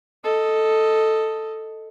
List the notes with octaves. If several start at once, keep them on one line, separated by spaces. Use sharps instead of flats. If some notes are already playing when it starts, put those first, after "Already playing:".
A4 D#5